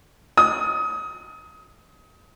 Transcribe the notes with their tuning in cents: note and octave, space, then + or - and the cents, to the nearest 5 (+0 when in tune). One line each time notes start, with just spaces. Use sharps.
D#6 +25